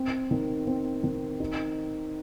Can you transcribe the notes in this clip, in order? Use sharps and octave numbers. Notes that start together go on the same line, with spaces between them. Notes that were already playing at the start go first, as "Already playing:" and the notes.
Already playing: C4
D#3
C4
D#3
D#4